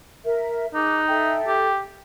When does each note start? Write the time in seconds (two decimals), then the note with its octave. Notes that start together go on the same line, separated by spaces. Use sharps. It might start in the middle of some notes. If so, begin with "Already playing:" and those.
0.24 A#4 E5
0.74 D#4 G#4 D6 F#6
1.07 A4 E5 G5
1.47 G4